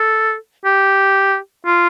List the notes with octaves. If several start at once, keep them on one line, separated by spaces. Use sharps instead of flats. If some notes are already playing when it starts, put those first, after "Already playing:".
Already playing: A4
G4
F4